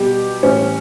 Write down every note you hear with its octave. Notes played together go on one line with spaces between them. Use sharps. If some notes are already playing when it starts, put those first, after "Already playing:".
Already playing: B2 G3 G4
A2 E3 G3 C#4